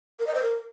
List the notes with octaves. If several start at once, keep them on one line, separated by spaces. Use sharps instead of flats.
A#4
D#5
C5
A#4